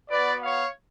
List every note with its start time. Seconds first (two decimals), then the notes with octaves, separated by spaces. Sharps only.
0.10 B3 F#4 B4 D5
0.43 C#5 F5